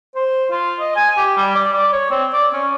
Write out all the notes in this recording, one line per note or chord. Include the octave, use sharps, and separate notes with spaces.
C5
F4
D#5
G#5
G4
G3
D5
D5
C#5
C4
D5
C#4